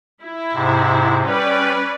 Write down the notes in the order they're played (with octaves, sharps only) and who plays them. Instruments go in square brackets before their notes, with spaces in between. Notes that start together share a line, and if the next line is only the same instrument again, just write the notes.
[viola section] E4
[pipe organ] G#2 C3
[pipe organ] G3 [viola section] C#4 B4 D5